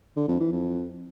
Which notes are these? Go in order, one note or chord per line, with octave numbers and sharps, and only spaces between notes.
D3
F2
E3
F2